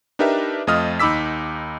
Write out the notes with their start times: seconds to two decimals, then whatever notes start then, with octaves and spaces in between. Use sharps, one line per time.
0.19 D4 D#4 G4 A#4 B4 E5
0.67 F2 A3 F4 D#5 D#6 F6
0.99 D#2 D#4 B5 D6 E6 B6